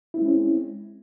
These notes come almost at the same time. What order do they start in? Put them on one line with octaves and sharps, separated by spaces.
E4 C4 G#3 C#4